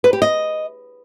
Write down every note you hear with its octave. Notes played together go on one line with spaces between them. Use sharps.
B4
G4
D#5